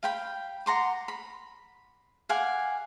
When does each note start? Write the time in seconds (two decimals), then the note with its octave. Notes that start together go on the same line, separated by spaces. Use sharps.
0.03 F5 G5 B5
0.66 F#5 A#5 C6 D6
1.08 B5
2.29 F5 F#5 G#5 D6